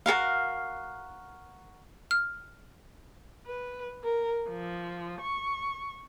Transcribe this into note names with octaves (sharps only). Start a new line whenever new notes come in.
F#4 A4 A#4 F5
F6
B4
A#4
F3
C#6